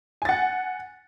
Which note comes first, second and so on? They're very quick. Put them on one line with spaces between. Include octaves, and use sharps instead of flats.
G#5 A6 F#5